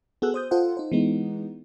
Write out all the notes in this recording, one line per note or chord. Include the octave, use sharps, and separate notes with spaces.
B3 F#4 G#4 A4 E6 F#6
C5 D#6 G6
F4 A4 C5 F#5
D#4 C5
E3 G#3 B3 D#4